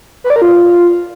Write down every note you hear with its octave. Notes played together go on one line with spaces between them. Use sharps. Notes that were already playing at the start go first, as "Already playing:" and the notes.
B4
D5
A#4
F4